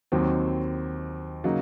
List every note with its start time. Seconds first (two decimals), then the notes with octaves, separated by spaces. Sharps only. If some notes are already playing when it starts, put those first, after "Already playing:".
0.12 D#2 D#3 F#3 C4
1.44 C#3 F#3 A#3 D#4